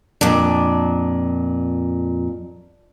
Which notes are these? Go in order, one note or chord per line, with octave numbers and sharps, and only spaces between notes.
F2 A#2 D4